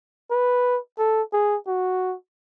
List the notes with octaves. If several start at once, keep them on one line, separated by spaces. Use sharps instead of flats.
B4
A4
G#4
F#4